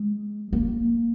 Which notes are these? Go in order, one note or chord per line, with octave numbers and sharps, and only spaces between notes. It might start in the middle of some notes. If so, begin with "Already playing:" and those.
Already playing: G#3
A#3